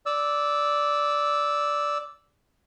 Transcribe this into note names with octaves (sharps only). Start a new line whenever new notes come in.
D5 E6